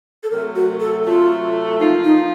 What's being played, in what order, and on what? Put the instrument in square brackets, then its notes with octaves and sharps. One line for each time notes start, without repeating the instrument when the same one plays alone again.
[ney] A4
[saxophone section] C3 F#3 A3 [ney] A#4
[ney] F#4
A4
[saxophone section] C3 F#3 A3 [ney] F4
[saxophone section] F3 A#3 F4 [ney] D#4
[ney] D#4